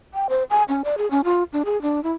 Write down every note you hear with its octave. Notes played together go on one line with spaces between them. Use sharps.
G5
C5
G#5
C#4
D5
G#4
C#4
F4
D4
G#4
D4
E4